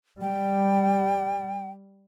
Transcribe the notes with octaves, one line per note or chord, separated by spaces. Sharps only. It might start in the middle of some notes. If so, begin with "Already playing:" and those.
G3 G5